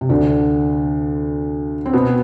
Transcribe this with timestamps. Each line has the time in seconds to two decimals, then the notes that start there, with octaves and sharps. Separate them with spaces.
0.01 C3
0.09 D2 D3
1.86 C4
1.93 B2 B3